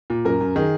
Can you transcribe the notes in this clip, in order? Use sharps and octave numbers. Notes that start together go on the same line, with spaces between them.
A#2
F#2 A#4
F#2
D#3 G#4